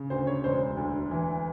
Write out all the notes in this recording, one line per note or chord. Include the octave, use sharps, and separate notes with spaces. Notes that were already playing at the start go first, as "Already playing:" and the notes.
Already playing: C#3
D2 C5
C#5
E1 C5
D2
E3